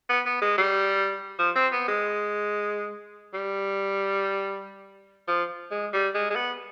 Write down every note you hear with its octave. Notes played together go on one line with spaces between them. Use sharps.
B3
B3
G#3
G3
F3
C4
B3
G#3
G3
F3
G#3
G3
G#3
G#3
B3